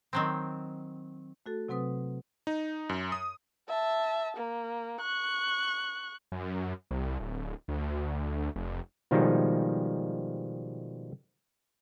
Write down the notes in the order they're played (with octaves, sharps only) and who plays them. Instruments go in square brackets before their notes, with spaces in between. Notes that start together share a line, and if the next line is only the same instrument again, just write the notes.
[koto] D#3 F#3 C4
[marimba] A3 F#4 A4
C3 F#3 C4 B4 D#6
[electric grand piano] D#4
F#2
D#6
[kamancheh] E5 A5
A#3
C#6 F#6
[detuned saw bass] F#2
C2
D1
D2
F1
[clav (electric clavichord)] B2 D#3 F3 G3 G#3 D#4